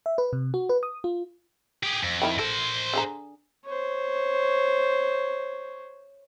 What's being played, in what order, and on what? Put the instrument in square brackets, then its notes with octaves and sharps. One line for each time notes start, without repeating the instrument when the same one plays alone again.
[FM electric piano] E5
B4
C3
F#4
B4
D#6
F4
[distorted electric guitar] G4 G#4
F2
[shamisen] D#3 E4 G5
[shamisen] A4 [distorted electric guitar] A#4 C5
[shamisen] D3 G#4 A#5
[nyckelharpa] C5 C#5